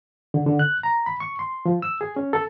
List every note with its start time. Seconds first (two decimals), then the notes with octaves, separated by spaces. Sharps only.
0.34 D3
0.46 D3
0.59 F#6
0.83 A#5
1.06 B5
1.20 C#6
1.39 C6
1.66 F3
1.82 E6
2.01 G#4
2.16 C#4
2.33 A4